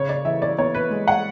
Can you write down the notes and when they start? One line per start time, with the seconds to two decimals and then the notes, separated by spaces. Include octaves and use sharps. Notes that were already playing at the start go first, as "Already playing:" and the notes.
Already playing: C#3 C#5
0.09 D5
0.25 E3 E5
0.42 D5
0.58 B3 C#5
0.75 B4
0.90 G#3
1.08 F#5